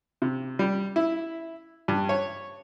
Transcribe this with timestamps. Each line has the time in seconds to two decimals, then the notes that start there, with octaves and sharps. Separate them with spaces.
0.22 C3
0.59 G3
0.96 E4
1.88 G2
2.09 C#5